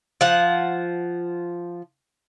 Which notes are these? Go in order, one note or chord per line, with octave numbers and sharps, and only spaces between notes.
F3 F#5